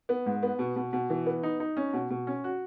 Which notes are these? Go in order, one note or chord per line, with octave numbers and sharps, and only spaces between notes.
B3
G#2
B3
B2
B2
B2
E3
B3
D#4
D#4
C#4
B2
B2
C#4
F#4